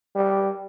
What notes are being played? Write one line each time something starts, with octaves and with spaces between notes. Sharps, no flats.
G3